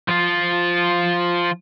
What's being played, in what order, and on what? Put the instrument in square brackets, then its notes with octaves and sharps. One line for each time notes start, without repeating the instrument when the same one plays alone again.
[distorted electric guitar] F3 F4